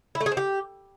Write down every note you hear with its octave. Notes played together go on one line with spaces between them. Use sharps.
E4
A3
G#4
C4
G4